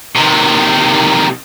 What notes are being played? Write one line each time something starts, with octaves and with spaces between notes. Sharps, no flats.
C3 D#3